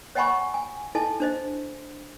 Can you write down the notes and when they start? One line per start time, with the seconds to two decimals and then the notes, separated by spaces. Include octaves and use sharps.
0.15 C#5 D#5 F#5 G#5 B5 C#6
0.54 G#5
0.95 E4 A4 D#5 G#5 A5
1.20 D4 C5 D#5